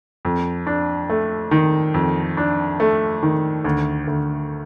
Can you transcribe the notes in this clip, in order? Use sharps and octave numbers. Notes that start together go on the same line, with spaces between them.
F2
D4
A3
D#3
F2
D4
A3
D#3
D2
D2